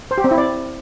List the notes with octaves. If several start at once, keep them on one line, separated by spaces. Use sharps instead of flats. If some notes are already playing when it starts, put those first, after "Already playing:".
C5
G4
C4
E4
D5